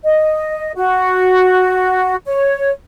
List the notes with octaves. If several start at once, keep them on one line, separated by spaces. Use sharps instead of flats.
D#5
F#4
C#5